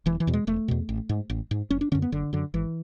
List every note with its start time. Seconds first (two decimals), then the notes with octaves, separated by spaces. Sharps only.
0.06 E1 E3
0.20 E3
0.27 E2 B2
0.33 G#3
0.47 E1 A3
0.68 E2 B2
0.89 A1
1.09 G#2
1.30 A1
1.51 G#2
1.70 F#1 C#4
1.81 D4
1.92 D3 C#4
1.95 F#2
2.02 B3
2.12 F#1 D3
2.33 F#2 D3
2.54 G#1 E3